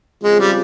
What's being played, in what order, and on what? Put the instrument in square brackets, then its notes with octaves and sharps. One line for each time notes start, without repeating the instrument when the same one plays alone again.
[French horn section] C#3 F3 C4 F4 [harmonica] G#3
[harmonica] G3